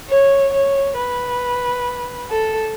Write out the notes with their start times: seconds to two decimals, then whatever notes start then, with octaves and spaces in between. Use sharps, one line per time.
0.09 C#5
0.53 C#5
0.98 B4
2.30 A4